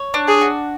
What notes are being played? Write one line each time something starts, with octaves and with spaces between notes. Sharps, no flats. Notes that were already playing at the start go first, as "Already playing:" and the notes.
Already playing: C#5
D4
G#4
F#4